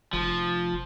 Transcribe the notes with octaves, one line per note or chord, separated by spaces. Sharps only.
F1 F3